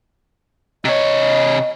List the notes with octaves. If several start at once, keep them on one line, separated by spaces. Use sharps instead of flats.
C3 C#5 D#5